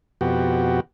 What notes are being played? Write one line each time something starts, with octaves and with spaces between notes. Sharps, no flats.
F2 B2 F#4 G4